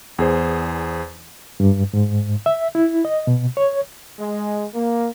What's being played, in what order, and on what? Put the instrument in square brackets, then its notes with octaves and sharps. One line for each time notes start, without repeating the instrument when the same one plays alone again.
[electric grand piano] E2 G#4 C5
[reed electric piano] G2
G#2
E5
E4
D#5
B2
C#5
[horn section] G#3
A#3